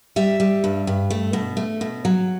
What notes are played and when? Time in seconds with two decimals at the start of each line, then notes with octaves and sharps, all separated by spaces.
0.16 G3 E5
0.40 G3
0.64 G2
0.87 G2
1.10 A3
1.33 B2
1.57 A3
1.81 B2
2.05 F#3